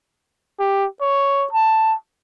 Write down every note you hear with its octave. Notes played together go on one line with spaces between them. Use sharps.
G4
C#5
A5